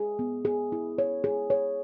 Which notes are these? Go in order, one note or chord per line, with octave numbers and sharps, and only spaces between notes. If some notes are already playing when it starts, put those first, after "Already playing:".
Already playing: G#4
B3
G#4
E4
C#5
G#4
C#5